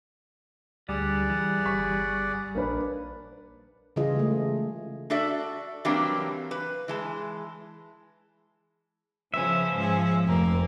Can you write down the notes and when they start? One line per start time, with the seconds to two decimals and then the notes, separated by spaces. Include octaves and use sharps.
0.89 D2 G3 G#4 D5 F#5
1.30 E3 G3
1.65 G1 C#6 B6
2.55 A#1 A#3 D4 B4
3.96 C#3 E3 G3 F4 G#4 D#5
4.16 G#3 A3
5.10 D4 F#4 A4 D5 E5
5.85 E3 F#3 G3 A#3 C4 D4
6.51 B4
6.88 E3 G#3 A5
9.34 C#3 F3 B3 C#4 E5
9.74 G#2 C#4 G#4
10.25 F1 A3 A#3 C4